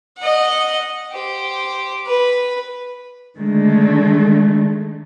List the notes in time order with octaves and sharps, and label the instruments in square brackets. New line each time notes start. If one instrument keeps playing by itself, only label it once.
[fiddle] D#5 F#5
G4 C5
B4
[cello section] D3 D#3 G#3 A3